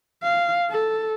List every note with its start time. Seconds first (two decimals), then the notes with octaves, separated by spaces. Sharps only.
0.24 F5
0.71 A4